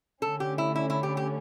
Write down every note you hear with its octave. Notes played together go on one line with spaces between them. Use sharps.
D3 A3 C#4 A4
G4
E4
E4
E4
G4
G4